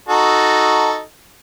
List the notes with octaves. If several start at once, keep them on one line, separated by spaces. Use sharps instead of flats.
D#4 F#4 A4